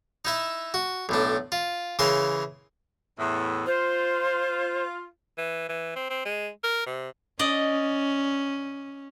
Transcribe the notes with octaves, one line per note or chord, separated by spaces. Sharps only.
D#4 E4 E5
F#4
B1 A2 D4
F4
C#3 E3 A#4 C6
E2 A2
F4 C5
E3
E3
C4
C4
G#3
A#4
C3
C#4 D5 D#5